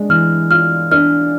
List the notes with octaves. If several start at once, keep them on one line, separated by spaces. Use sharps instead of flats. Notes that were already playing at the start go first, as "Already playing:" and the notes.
Already playing: G#3 D4
E3 F6
F4 F6
D4 F6